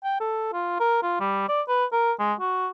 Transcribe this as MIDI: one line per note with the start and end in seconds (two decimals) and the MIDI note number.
0.04 0.17 79
0.20 0.51 69
0.53 0.77 65
0.80 1.02 70
1.02 1.18 65
1.20 1.44 55
1.49 1.62 74
1.68 1.85 71
1.92 2.12 70
2.19 2.34 56
2.40 2.68 66